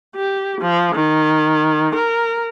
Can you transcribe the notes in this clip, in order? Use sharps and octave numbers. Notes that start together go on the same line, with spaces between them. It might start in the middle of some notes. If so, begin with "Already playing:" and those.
G4
F3
D#3
A#4